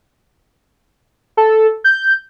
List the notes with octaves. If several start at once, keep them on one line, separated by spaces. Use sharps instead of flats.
A4
G6